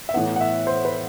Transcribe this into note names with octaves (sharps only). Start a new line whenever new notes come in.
E5
A2 E3 B3 F#5
F#5
E5
C5
B4